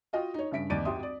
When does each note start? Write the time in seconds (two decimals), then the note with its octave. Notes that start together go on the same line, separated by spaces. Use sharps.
0.13 F4 F#4 D#5 F5 G5
0.34 D#4 C#5
0.51 G2 C#3 E5 B6 D7
0.70 F1 D#2 D5 A6 D7 D#7
0.85 G#1 G4 E5 C6 D#6
1.03 D5